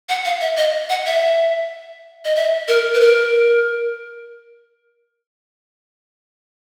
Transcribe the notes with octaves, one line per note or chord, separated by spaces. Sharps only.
F#5
F5
E5
D#5
F#5
E5
D#5
E5
A#4
B4
A#4